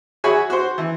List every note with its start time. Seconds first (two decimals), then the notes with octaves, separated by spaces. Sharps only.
0.24 F#4 G#4 C#5 E5 G#5 B5
0.50 F#4 C5
0.78 E3